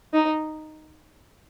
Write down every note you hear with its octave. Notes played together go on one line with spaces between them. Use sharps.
D#4